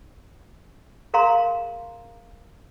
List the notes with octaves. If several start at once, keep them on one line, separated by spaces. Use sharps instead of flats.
G#4 A#4 F5 A#5 C6